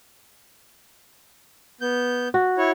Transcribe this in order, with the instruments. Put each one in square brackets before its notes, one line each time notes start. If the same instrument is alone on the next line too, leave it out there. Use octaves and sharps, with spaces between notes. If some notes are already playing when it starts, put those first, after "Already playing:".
[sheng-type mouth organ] B3 G6
[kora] F#4
[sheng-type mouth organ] E4 C#5